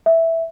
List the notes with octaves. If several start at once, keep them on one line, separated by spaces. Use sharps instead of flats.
E5